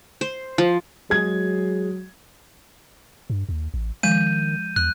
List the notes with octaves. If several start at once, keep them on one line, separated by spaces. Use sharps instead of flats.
C5
F3
F#3 G#3 G#4 G#6
G2
D#2
A1
D#3 F3 G#3 G6 D#7
E2 F#6